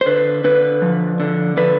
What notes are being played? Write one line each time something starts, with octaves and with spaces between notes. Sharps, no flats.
C5
D3 B4
D3 B4
F3
D3
D3 B4